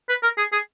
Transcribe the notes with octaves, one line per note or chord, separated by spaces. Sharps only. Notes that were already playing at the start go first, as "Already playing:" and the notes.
B4
A#4
G#4
G#4